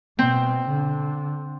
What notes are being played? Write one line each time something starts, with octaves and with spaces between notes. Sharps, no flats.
B2 C4
D3